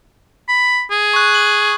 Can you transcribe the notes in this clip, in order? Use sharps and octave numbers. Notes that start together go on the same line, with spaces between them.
B5
G#4
C#6 F#6
F#7